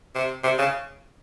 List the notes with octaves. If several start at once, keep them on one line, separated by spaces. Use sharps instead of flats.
C3
C3
C#3